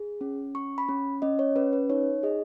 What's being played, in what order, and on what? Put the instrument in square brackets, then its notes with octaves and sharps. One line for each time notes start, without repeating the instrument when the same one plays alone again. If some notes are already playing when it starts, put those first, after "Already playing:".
Already playing: [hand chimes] G#4
C#4
C#4 C#6
B5
C#4
C#4 D#5
C#5
C#4 B4
B4
D#4 C#5
G#4 D#5